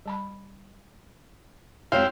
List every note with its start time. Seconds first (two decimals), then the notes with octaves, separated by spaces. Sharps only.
0.06 G3 A5 B5
1.92 F2 F#3 G#3 E4 F5 G5 C6